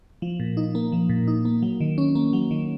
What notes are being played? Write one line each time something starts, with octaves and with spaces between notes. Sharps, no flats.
F3
A#2
D#4
A#3
F3
A#2
D#4
A#3
F#3
D#3
C#4
A#3
F#3
D#3